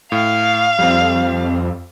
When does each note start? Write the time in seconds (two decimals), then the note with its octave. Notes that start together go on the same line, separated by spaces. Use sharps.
0.12 A2 F5
0.79 F2 G3 C4